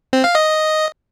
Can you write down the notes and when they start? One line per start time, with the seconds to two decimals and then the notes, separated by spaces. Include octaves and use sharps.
0.13 C4
0.24 F5
0.35 D#5